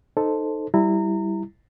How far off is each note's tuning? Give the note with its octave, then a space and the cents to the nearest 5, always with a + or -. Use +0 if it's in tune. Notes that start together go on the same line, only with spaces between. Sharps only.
D#4 -10 A4 +0 C5 +0
G3 -5 E4 +0 A#5 -25